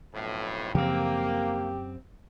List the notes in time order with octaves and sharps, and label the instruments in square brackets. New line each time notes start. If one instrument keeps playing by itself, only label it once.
[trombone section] B1 F2 A2
[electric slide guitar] F#2 C4 [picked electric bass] C#3 F3 [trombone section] A#3 [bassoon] G4